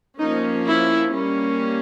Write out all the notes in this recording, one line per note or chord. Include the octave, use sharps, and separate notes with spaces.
F3 A#3 C#4 D#4
E4
G3 A#3 C#4